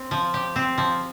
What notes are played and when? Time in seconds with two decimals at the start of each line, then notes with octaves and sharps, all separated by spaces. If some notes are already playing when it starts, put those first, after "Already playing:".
Already playing: C4
0.11 F3
0.34 G4
0.56 C4
0.78 F3